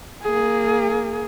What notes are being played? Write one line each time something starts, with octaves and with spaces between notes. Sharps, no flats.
A#3 G#4